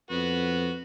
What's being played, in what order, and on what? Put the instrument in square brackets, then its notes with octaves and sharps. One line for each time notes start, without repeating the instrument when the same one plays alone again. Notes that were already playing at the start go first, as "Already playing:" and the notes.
[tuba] F2 [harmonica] B3 F#4